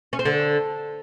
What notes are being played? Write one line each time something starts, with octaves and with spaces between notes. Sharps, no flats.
C#4
C4
D3